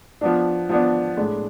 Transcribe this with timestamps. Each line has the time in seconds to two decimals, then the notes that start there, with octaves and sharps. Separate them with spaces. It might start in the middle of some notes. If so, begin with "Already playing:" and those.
0.21 F3 B3 D4
0.69 F3 B3 D4
1.17 A2 G#3 D4